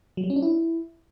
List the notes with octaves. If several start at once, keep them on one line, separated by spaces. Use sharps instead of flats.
F#3
G3
C#4
D4
E4